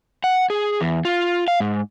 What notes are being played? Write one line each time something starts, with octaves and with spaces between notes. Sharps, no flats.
F#5
G#4
E2
F4
F5
G#2